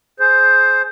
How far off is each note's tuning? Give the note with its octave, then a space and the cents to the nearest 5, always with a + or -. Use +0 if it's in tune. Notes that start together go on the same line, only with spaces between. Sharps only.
G#4 +20 C5 +0